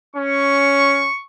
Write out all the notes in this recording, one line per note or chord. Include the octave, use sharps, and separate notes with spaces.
C#4 C#6